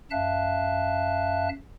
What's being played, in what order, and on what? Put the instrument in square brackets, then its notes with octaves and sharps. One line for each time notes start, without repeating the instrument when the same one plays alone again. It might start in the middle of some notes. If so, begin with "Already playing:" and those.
[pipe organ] F#2 E5 F5 A5 F#6